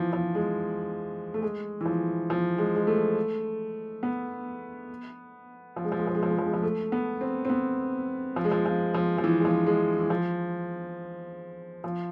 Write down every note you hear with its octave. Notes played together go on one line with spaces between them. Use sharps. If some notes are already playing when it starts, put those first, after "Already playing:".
Already playing: E3 F3
F3
G#3
A3
G#3
E3
F3
F3
G#3
G#3
A3
B3
F3
G#3
F3
G#3
F3
G#3
F3
G#3
F3
G#3
F3
A3
B3
C4
C4
B3
F3
G#3
F3
F3
F3
F3
E3
G#3
F3
G#3
E3
F3
F3